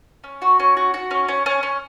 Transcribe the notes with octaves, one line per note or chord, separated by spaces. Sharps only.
C#4
F#4
C#4
F#4
F#4
C#4
C#4
C#4
C#4